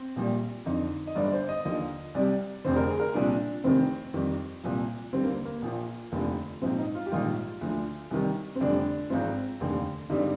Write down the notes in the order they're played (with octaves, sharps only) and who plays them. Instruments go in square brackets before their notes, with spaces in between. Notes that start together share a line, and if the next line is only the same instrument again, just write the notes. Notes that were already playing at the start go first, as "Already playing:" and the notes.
Already playing: [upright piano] C4
A#1 A#2 G3
F2 D3 F3 D#4
D#5
G1 G2 D3 D5
C5
D#5
D#2 D3 F3 D#5
C2 C3 G3 D5
F1 F2 D3 C5
A#4
G#4
A#4
C2 A#2 F3 D4
F1 F2 C3 D#3 C4
F2 D#3 G3
C2 A#2 F3
D#2 D3 G3 C4
A#3
A#3
A#1 A#2 F3
F1 D#2 D3 F3
A#1 G#2 F3 C4
D#4
F4
G4
A#1 G#2 D#3 G3 F4
D2 D3 F3
C2 C3 D#3 G3
C4
F1 F2 D3 G3 D4
G#1 G#2 F3 C4
F1 D#2 D3
G#1 G2 D3 G3 D#4